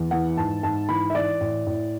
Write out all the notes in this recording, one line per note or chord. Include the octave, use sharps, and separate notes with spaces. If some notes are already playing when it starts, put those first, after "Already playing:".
Already playing: E2
E3 F#5
G#2 A5
G#2 A5
E3 B5
E5
E3 D5
A2
A2